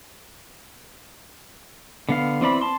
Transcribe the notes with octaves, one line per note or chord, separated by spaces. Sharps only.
D3 B3 F5
E3 C4 D5 B5
A5 C6